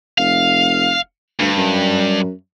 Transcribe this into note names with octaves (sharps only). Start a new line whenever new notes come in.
F1 F5
D2 G2
F#2